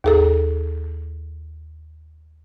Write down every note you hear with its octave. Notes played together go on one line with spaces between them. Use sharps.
D#2 G#4 A4